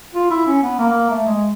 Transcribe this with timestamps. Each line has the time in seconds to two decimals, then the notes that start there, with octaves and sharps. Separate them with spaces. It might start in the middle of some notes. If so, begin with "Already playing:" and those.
0.15 F4
0.31 E4
0.47 C#4
0.63 B3
0.79 A#3
1.10 A3
1.26 G#3